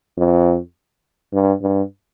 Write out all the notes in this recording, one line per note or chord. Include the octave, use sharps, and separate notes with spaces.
F2
G2
G2